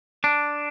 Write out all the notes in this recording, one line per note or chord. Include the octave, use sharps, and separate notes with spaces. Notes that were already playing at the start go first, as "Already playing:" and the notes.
D4